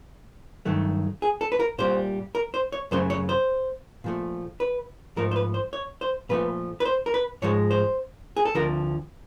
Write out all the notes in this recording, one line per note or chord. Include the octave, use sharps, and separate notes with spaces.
G2 D#3 F#3 A3
G#4
A4
B4
A#4
A#2 G3 C5
A#4
C5
C#5
F#2 C#3 F#3 A3 C5
C#5
C5
A#2 F3 A3
B4
G#2 F3 A3 A#4
C5
B4
C5
C#5
C5
A#2 F3 A3 B4
B4
C5
A#4
B4
G#2 F3 G#3 C#5
C5
G#4
A4
D2 D3 F3 A#4